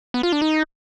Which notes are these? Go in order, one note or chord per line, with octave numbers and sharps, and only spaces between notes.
B3
F4
D4
D#4